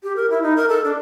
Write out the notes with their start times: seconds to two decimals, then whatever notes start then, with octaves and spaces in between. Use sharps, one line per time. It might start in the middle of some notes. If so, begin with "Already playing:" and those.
0.03 G4
0.16 A#4
0.30 E4
0.42 D#4
0.56 A#4
0.69 A4
0.84 D4